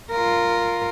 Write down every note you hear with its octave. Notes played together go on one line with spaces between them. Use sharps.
F4 A#4